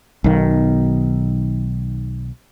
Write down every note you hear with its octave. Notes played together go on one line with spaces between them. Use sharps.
B1 D#3